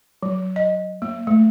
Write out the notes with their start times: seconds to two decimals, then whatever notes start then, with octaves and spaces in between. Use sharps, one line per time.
0.23 F#3
0.56 D#5
1.02 A#3
1.27 A3